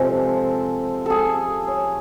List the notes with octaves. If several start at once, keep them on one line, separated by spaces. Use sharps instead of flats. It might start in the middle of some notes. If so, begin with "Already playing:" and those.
Already playing: C3 F3 G#3 A4
G#4 A4
C#5